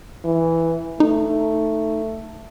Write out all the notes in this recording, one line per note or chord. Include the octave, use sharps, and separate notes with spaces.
E3
A3 D#4